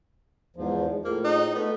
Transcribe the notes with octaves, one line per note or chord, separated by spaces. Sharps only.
E2 G#2 F3
A2 A#3 F4 G#4 C5
D#4
A3 B3 A4